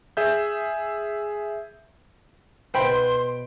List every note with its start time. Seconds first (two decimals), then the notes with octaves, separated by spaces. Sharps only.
0.17 G#4 E5 G6
2.74 B2 C5 E5 G5 B5 C6